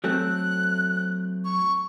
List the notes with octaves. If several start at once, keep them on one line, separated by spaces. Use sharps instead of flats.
F#3 A3 C4 F#6
C#6